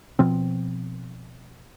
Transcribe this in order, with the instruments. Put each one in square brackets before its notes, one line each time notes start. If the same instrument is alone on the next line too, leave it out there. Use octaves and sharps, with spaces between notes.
[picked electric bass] B2 F3 C4